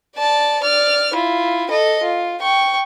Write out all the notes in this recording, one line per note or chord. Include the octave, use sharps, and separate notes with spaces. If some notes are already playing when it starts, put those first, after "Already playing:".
D5 A5
D5 F6
E4 F4
A4 D#5
F4
G5 C#6